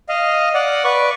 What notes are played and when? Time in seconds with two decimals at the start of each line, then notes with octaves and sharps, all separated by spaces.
0.09 D#5 F5
0.54 D5 F#5
0.84 B4 D5 C#6